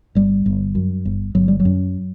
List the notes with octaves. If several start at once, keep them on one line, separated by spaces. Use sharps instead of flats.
G1 G3
G1
F#2
G1
G1 F#3
G3
F#3
F#2